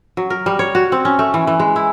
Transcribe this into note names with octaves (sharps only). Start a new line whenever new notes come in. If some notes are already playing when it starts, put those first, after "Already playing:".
F#3
A#4
G3
C#5
F#4
C4
C#4
A3
E3
E3
G#3
E4